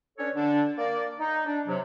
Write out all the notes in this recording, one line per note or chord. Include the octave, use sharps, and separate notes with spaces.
C#4 D4 A4 B4 C#5
D3 D4
A#3 D5
D#4
D4
C3 F#3